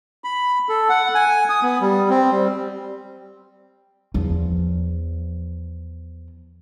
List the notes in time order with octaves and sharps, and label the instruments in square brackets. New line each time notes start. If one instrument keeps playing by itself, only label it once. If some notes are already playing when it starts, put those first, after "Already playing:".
[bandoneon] B5
A4
F#5
G#5
D#6
B3
G3
C4
G3
[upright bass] E2 F3